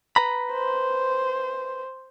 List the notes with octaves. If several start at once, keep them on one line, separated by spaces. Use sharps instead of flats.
B4 A#5 B5
C5